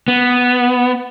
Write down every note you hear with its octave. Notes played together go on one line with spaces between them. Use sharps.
B3